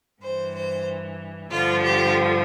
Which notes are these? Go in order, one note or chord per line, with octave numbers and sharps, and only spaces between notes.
G2 E3 C5
C5
G2 D3 F3 F4
G4